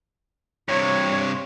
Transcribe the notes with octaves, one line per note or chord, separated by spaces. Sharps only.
G2 C3 C#5